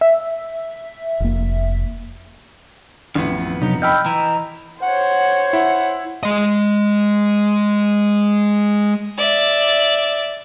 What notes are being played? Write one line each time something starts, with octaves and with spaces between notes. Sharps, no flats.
E5
F1 A#3
A1 F2 B3
C3 F#3 D#4
D#5 G5 B5 E6 F6 G6
E3 A#5
C5 C#5 F#5
E4 F#5
G#3 D#5
D5 E5